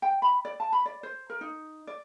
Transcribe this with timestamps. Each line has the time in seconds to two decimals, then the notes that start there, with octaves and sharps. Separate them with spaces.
0.02 G5
0.22 B5
0.45 D5
0.60 A5
0.73 B5
0.85 D5
1.03 C5
1.30 A#4
1.41 D#4
1.87 D5